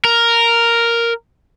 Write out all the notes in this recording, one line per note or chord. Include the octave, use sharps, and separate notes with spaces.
A#4